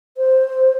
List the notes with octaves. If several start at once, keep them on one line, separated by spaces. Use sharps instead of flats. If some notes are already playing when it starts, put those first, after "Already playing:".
C5